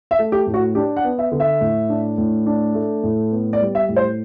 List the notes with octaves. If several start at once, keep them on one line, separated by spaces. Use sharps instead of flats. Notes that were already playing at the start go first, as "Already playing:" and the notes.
E5
A3
G4
A2
F#4
D4 G4
F#5
B3
E5
D3
E5
A2
D4
A2
D4
A3
A2
B3
D5
G3
E5
A2
C5